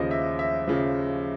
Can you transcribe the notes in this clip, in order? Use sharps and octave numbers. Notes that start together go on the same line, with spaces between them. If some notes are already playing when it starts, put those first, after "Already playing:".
Already playing: D#2 C#3 F3 D#5
E5
E5
C#3 F3